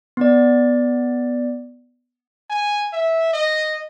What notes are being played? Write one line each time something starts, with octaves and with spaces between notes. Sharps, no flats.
B3 D5
G#5
E5
D#5